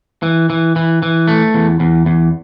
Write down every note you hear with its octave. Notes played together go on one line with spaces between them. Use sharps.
E3
E3
E3
E3
A3
E2
E2
E2